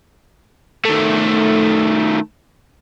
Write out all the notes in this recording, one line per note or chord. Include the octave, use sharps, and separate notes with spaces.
D#3 A3